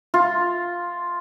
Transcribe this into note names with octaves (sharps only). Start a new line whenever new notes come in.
F4